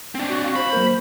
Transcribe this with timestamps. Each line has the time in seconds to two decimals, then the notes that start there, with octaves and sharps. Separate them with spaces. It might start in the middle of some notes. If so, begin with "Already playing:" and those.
0.15 C4 D4
0.29 F#4
0.44 F5 C#6
0.56 C5 B5
0.73 F#3 A#3 A#4